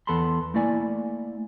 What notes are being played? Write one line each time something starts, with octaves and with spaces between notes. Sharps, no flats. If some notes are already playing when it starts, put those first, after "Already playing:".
E2 B3 A4 A5 B5 C6
A3 A#3 E4 D5 G#5